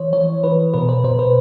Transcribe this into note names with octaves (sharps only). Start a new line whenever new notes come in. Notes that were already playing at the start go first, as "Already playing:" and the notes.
Already playing: E3 C5 C#5
E3 C#5
E3 B4
B2 B4
C5
B2 C5
B4